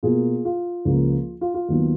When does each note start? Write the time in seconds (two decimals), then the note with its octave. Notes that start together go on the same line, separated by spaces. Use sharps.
0.03 B2 A#3 F4 G#4
0.45 F4
0.85 C#2 C#3 F3 A#3
1.41 F4
1.54 F4
1.68 D#2 D#3 F#3 B3